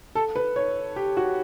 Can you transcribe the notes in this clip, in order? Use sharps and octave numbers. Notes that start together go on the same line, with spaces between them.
A4
B4
C#5
G4
F#4